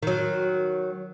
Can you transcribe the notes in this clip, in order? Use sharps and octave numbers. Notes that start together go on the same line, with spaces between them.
D#3 F#3